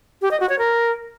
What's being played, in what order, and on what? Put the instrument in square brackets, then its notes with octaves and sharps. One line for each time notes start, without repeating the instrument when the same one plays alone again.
[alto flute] G4
D#5
F#4
C#5
A#4